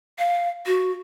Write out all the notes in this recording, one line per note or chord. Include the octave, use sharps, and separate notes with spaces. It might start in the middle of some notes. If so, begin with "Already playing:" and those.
F5
F#4